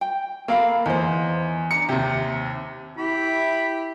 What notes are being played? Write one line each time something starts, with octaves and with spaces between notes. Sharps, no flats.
G5
A#3 A4 F5 B5
E2 D#4 C5
D4 A#5 C#7
D#2 C3 G4
E4 G4 B5